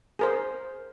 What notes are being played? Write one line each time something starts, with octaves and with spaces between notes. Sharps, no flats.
G#4 A#4 C5